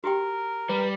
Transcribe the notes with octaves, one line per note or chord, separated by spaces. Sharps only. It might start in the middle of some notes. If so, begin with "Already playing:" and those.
F#4 G4 A#4 G5
G3 B4